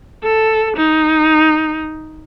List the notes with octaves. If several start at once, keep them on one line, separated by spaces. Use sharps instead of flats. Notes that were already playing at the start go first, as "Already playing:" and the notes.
A4
D#4